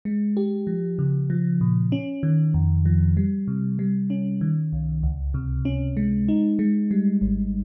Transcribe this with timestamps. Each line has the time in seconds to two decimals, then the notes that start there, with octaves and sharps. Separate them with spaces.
0.05 G#3
0.37 G4
0.67 F3
0.99 C#3
1.30 F3
1.61 A#2
1.92 C#4
2.23 D#3
2.54 F2
2.85 F3
3.17 G3
3.48 C3
3.79 G3
4.10 C#4
4.41 D#3
4.73 C2
5.03 C#2
5.34 C3
5.65 C#4
5.97 G#3
6.28 D#4
6.59 G#3
6.91 G3
7.21 G#1